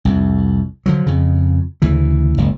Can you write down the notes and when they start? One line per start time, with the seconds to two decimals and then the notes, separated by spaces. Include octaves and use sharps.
0.05 C2 F2
0.86 D3 F3 F#3
1.07 F2 C#3
1.82 D2 C#3 E3
2.38 F#1 C#2